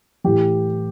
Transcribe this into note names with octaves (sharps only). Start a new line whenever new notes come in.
A2 E3 G4